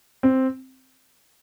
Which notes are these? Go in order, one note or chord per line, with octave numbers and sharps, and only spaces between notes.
C4